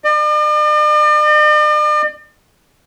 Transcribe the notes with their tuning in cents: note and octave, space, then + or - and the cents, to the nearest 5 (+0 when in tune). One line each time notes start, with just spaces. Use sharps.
D5 +45